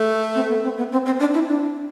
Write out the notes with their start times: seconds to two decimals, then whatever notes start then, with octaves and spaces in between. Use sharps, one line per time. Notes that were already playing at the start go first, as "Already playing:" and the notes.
Already playing: A3
0.35 C4
0.49 B3
0.64 C4
0.78 B3
0.92 C4
1.06 C4
1.20 D4
1.34 E4
1.48 D4